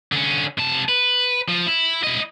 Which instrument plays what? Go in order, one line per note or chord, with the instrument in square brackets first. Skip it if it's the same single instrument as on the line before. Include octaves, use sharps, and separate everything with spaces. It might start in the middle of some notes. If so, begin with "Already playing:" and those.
[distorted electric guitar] D3 C#4
C3 A5
B4
F3
E4
E4 D#5